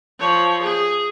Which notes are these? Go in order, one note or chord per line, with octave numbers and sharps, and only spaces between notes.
F3 C#5
G#4